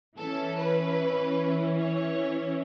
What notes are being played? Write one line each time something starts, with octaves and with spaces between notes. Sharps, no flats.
E3 C#4 A4
B4
C#5